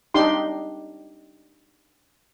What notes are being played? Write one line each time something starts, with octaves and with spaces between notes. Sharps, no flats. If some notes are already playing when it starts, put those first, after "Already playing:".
D4 D#4 G4 C6